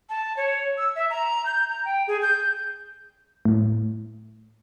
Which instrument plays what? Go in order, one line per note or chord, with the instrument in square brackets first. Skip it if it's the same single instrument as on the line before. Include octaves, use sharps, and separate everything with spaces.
[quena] A5
C#5
E6
E5
A#5
G6
A#5
G5
G#4
G6
[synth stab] A2